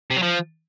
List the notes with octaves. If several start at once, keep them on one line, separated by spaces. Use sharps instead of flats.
C3
F#3
F3